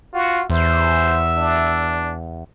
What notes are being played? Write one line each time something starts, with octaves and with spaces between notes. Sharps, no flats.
F4 F#4
E2 C5 E5
D4